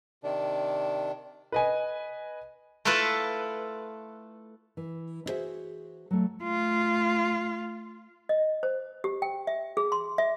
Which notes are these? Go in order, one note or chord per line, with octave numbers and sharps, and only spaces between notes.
C3 D#3 D4
B4 D#5 G#5
A3 E4 F4 A4 B4
E3
E4 F#4 G#4 A#4 C5 E5
F#3 A3
A3 F4
D#5
C5
G4
G5
E5
G#4
C6
E5